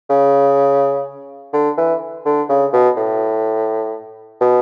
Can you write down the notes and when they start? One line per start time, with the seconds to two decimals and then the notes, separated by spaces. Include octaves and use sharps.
0.10 C#3
1.53 D3
1.77 E3
2.26 D3
2.49 C#3
2.73 B2
2.97 A2
4.41 B2